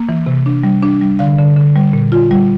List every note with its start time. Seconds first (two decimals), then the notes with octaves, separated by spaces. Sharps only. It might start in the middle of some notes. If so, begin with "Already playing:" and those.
Already playing: A#3
0.09 E3
0.26 C3
0.46 D4
0.63 G3
0.82 D4
1.01 G3
1.19 D3 F5
1.38 D3
1.57 D3
1.76 G3
1.93 A#2
2.12 F4
2.31 G3